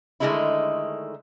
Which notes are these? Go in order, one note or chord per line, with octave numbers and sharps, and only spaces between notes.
D3 D#3 G#3 A3 D#4 E4